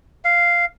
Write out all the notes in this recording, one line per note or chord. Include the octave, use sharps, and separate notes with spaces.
F5